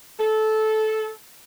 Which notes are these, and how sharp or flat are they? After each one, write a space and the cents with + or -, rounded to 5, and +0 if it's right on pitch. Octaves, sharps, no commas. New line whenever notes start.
A4 -15